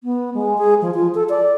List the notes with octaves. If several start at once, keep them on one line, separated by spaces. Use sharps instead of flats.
B3
G#3
G#4
F3
F4
A4
D5